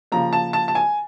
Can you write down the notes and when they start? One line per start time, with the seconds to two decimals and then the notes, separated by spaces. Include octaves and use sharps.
0.12 C#3 F3 A#3 A#5
0.33 A5
0.53 A5
0.68 A5
0.75 G#5